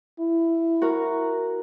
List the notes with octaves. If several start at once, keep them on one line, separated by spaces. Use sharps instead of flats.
E4
F#4 A#4